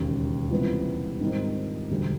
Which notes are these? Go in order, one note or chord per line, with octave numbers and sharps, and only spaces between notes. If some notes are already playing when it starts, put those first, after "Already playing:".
Already playing: E1 D#2 C#3
C#2 C3 E3 G3 B3
G#2 D#3 G3 C4 D#4
E1 D2 D3 G3